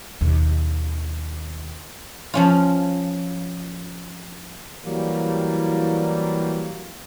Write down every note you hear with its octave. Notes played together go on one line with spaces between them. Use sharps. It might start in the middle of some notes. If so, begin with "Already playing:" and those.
D#2 B2
F3 C#4 F4
E3 F#3 G3 A#3